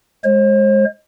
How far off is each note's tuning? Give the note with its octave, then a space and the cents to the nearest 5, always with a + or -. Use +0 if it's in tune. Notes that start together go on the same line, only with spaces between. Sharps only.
G#3 +0 C5 +45